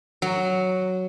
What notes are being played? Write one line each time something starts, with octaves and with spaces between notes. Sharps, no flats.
F#3